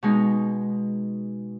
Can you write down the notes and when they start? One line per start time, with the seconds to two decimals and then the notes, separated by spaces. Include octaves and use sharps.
0.03 B2 G#3 D#4